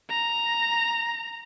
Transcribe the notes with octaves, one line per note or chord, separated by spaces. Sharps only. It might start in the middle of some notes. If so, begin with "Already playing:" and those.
A#5